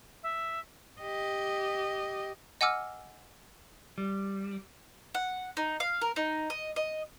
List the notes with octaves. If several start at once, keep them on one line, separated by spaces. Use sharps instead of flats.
E5
G4 D#5
D#5 F#5 G#5 D6 E6 F6
G3
F#5
D#4
F5
A#4
D#4
D#5
D#5